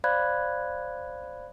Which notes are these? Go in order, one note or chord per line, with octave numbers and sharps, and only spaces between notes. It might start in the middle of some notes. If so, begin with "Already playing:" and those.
C5 D5 F5 B5 F#6 G#6